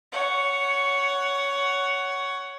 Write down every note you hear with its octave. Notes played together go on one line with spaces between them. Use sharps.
C#5 F#5